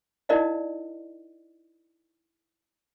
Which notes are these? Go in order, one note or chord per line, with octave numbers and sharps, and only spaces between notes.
D#4 E4 A#4 D5 D#5 F5